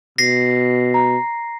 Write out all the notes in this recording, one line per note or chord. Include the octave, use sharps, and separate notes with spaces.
B2 A#6 C7
A#5